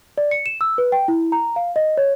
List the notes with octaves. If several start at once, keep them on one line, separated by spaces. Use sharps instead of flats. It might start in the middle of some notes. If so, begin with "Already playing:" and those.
D5
C#7
E7
E6
B4
G5
E4
A#5
F5
D#5
C#5